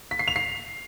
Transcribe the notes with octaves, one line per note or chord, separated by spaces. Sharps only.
B6
C7
F7
C7